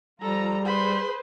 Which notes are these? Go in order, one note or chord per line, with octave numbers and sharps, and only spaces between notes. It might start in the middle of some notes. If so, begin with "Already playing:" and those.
F3 G3 F4 A4 A#5
G#4 B4 C5 B5 C6